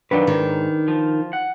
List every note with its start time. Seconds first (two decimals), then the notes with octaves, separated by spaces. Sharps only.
0.11 D#3 F3 F#3 D4 B4
0.27 G#2 D#3
0.88 F3
1.33 F#5